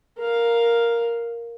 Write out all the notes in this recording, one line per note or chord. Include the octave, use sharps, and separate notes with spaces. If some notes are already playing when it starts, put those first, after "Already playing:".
A#4 F5